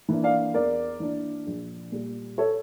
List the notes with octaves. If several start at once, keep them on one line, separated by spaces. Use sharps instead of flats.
E3 A#3 D4
D5 F5
E2 A#4 D5
E3 A#3 D4
A#1
A#2 G3
A4 C#5